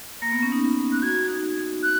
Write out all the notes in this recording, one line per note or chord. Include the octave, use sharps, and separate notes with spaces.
A#3 A#6
B3
C#4
D#4
F#6
F#4 G#6
D#4
F#6